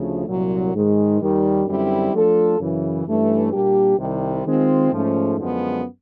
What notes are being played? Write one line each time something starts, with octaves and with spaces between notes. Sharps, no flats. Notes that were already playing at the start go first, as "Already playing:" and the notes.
Already playing: D2 C#3 F3 A3
C2 A#2 F#3
G#2 D#3 G#3
D#2 D#3 G3
F#2 D3 G3 C4 E4
F3 A3 D4 F4 A4
F#2 C#3 E3
G2 E3 A3 C#4
A#2 G3 A#3 D4 G4
C2 C3 D#3 G3
D#3 G#3 C4 F4
G#2 F3 A3 C#4
F#2 D3 F3 G#3 B3